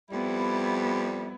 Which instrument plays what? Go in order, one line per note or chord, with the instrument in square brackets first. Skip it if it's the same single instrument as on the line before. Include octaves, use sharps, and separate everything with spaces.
[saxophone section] F2 G3 [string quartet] B3 E4